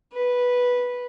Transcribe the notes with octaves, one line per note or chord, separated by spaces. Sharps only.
B4